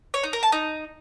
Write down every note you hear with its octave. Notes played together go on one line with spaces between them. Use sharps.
C#5
D#4
A#4
A5
D#4